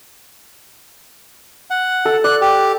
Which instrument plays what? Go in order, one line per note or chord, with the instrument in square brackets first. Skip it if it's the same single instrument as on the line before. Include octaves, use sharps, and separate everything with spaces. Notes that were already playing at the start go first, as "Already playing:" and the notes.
[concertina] F#5
[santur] A4
[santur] D5 [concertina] F#6
[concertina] G4